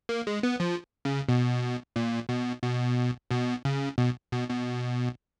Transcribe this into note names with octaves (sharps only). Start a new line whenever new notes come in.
A#3
G#3
B3
F3
C#3
B2
A#2
B2
B2
B2
C#3
B2
B2
B2